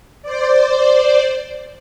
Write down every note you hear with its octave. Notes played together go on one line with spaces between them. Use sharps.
C5 D5